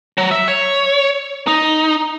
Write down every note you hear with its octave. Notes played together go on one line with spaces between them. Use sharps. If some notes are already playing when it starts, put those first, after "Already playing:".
F#3
E5
C#5
D#4